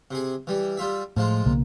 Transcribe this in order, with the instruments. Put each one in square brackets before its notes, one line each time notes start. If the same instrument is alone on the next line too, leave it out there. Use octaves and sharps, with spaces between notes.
[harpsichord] C3 G#4
E3 G3
G3 F4 E5
[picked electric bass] A2 [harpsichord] F3 G#3 F4
[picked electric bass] B1 C#3 A#3